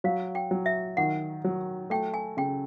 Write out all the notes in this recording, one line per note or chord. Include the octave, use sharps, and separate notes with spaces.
F#3 F5
G5
F#3
E5
D#3 F#5
F#3
A3 G5
G#5
C#3 G5